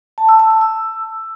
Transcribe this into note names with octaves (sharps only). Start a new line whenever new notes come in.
A5
E6
A5
E6
E6